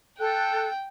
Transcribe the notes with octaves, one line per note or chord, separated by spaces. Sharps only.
A4 G5 F#6